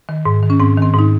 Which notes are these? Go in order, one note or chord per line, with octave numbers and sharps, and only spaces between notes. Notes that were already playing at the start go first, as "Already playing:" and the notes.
D#3
G#2
D#3
C#4
G#2 C4
D#3 C4
G#2 D#4